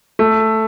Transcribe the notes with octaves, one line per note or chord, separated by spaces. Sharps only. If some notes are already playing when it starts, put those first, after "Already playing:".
A3